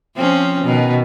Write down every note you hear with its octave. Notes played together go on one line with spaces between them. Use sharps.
F3 C4 C#4
B2 D#3